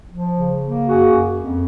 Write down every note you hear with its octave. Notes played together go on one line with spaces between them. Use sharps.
F3
C#3
A#3
F#2 F#4 G#4
F#2
F2